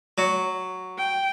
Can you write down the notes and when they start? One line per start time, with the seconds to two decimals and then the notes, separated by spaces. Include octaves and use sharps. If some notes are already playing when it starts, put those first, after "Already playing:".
0.18 F#3
0.98 G5